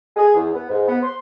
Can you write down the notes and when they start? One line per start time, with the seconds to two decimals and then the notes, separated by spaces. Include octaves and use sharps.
0.17 G#4
0.35 E2
0.54 B3
0.70 G#2
0.88 B3
1.03 C6